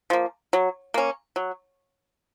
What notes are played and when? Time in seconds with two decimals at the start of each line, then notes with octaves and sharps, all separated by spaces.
0.10 F3 A#3
0.53 F#3
0.94 A#3 C#4
1.36 F#3